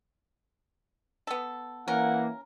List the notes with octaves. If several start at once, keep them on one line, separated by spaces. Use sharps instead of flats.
B3 A4
E3 A#3 C#4 A#4 F#5